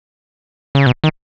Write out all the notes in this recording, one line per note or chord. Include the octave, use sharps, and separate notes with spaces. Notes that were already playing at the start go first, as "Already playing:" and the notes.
C#3
B2
D#3